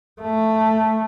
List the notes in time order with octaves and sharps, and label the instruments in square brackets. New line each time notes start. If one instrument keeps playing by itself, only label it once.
[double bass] A3